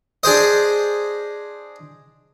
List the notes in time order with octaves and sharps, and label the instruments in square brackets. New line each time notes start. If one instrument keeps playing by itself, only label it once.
[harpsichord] D4 G#4 C5 D#5